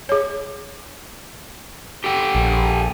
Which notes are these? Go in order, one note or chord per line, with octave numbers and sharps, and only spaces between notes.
G#4 C#5
G4 A4 G5
A#1